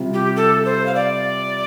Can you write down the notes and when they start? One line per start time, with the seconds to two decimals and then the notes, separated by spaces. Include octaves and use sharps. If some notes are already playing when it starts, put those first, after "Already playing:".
Already playing: C3 G3 F4
0.14 G4
0.36 A4
0.65 C5
0.86 F5
0.95 D5